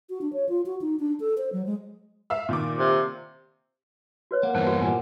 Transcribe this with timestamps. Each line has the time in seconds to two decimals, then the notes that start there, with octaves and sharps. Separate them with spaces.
0.10 F#4
0.21 D4
0.33 C#5
0.49 F4
0.66 F#4
0.81 D#4
0.99 D4
1.20 A4
1.38 C5
1.53 F#3
1.66 G#3
2.30 E5 F5 E6
2.49 A#2 D#3 D6
2.78 C3
4.31 F#4 B4 C#5
4.43 A#3 F#5
4.55 G2 E3 B3 C5 A5
4.67 F#4
4.82 A#2 G3 A#4 F#5 G#5